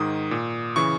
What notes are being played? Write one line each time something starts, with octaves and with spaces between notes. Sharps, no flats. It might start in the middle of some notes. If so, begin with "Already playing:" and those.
Already playing: G#2 D#3 D#6
A#2
C#3 E3 C#6